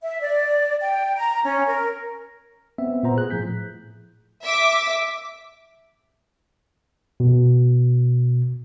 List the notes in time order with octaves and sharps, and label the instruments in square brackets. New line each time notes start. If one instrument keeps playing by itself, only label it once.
[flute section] E5
D5
G5
A#5
C#4
A#4
[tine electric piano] B3 C4 E5
A#2 B3 C5 A#5
G#4 F#6
A2 F3 G6 B6
[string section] E5 D6 B6
[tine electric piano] B2